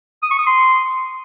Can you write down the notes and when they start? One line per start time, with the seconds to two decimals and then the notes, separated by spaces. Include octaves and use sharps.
0.23 D#6
0.31 C#6
0.39 D#6
0.46 C6